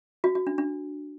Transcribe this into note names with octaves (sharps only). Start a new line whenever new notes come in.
F#4
F#4
D4
D4